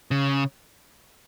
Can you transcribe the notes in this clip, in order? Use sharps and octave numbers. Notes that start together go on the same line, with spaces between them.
C#3